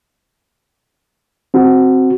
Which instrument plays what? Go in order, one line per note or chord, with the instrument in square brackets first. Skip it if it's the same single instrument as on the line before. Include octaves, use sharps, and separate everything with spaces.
[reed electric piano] C4 F#4